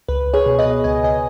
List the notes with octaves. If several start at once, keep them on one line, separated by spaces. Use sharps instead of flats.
C#2 B4
C#2
G#4 C#5
B2
B4 D#5
B2
C#2 D#5 G#5
C#2 D#5 G#5